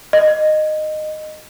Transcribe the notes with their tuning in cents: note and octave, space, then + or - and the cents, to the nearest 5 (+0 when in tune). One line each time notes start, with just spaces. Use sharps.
D#5 -15